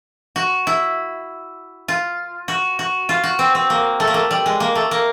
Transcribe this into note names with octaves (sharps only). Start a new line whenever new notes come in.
F#4
E4
F4
F#4
F#4
F4
F#4
C4
C4
A#3
A3
A#3
A3
G3
G#3
A#3
A3
A#3